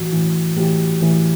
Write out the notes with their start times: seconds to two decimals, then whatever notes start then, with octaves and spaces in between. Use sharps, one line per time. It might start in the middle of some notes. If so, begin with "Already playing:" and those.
Already playing: A2 E3 F#4
0.13 A2 E3
0.56 A2 E3 G4
1.01 A2 E3